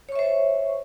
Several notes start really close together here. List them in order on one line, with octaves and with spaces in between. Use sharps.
C#5 C#6 E5 C5